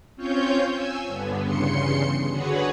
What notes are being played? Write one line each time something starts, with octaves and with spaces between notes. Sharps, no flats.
C4 C#4 F4 C#5 G6
G#5 E6
G2 D3 B3
E2 G2 C#3 C6 C#7
D3 F#4 G#4 B4 C#5 F#5